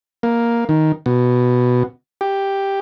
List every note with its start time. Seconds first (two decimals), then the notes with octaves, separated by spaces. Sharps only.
0.23 A#3
0.69 D#3
1.06 B2
2.21 G4